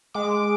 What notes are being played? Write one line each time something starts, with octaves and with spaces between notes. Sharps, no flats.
G#3 D6